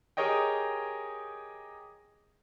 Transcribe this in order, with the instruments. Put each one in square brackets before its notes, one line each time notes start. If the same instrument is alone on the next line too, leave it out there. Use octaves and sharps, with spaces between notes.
[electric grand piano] G4 G#4 A#4 C#5 D#5 G5